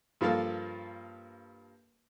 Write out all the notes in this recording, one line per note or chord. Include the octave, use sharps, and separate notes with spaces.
G2 F3 A#3 A4 F5